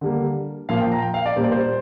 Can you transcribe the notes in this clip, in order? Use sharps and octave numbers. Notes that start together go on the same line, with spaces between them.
D3 G3 A#3
A#2 F3 A#3 F5
G5
A#5
G5
F5
D5
A#2 G3 A#3 C5
D5
C5